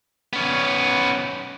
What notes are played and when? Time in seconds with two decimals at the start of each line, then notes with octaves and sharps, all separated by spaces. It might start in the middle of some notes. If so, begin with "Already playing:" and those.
0.33 B3 C#4